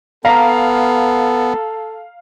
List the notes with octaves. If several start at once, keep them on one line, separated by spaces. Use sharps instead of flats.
B3 A4 F5 A#5 B6